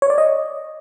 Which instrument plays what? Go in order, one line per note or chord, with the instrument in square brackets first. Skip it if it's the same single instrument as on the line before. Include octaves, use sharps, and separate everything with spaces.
[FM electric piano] C#5
D5
D#5